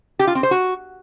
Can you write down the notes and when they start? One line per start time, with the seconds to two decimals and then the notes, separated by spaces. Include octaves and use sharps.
0.19 G4
0.27 F4
0.35 C4
0.43 C5
0.51 F#4